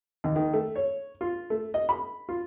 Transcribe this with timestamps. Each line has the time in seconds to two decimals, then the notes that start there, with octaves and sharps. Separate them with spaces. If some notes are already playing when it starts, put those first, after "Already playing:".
0.24 D#2
0.36 D#3
0.53 A3
0.75 C#5
1.21 F4
1.50 A3
1.74 D#5
1.89 B5
2.29 F4